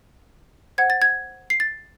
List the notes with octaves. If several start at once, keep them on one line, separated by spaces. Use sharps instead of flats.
C5 F#5 G#6
A6
G#6
C7
A6